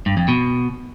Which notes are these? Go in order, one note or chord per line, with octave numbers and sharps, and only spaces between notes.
G2
F2
B2